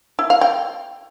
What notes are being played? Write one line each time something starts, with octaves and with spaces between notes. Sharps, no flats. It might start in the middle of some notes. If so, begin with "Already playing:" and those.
E4
F5
G5